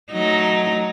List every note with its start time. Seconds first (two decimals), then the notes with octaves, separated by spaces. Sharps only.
0.12 F#3 A3 D#4